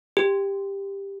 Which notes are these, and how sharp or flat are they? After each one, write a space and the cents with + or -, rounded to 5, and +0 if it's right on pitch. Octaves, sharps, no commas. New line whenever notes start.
G4 +10